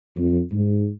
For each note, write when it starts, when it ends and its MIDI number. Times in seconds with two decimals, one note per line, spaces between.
0.16 0.40 41
0.51 0.87 44